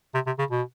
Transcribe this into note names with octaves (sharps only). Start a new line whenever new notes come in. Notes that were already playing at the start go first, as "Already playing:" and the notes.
C3
C3
C#3
B2